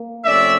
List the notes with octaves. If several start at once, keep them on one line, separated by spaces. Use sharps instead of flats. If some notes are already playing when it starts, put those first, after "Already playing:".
Already playing: A#3
C3 F3 A3 C#4 D5 E5